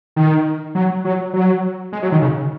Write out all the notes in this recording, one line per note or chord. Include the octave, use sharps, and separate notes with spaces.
D#3
F#3
F#3
F#3
G#3
F#3
D#3
C#3